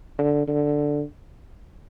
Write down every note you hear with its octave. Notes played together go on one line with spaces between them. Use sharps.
D3
D3